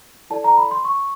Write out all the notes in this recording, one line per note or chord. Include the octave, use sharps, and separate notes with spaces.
E4 A4 D5 A5
A#5
B5
C6
C#6